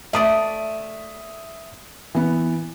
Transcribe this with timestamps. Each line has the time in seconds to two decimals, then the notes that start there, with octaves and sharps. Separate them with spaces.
0.13 A3 D5 E5 D#6
2.15 E3 B3